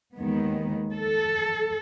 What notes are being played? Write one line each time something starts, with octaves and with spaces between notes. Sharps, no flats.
D#2 D#3 G#3 B3
A4